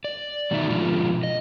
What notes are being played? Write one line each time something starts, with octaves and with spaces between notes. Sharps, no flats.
D5
B2 D#3 A3 D#4 F#4 E5
B2 D3 F3 G#3 F4
D#5